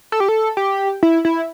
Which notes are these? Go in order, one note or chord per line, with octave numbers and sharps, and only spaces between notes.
A4
G4
A4
G4
E4
E4